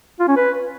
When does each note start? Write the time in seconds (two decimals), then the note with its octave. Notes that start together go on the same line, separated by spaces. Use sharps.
0.20 F4
0.28 C#4
0.37 B4